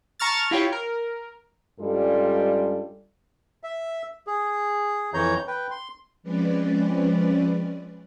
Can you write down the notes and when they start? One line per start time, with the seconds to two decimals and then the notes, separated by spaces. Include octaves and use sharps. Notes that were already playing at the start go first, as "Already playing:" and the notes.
0.20 A5 A#5 C#6 F6 A6
0.51 E4 F4 G4 C#5
0.72 A#4
1.80 G2 G3 G#3 C#4 F4 A4
3.64 E5
4.27 G#4
5.14 F2 E3 C#5 A#5 G6
5.47 B4 G5
5.71 C6
6.23 F3 G#3 C4 C#4 B4 D5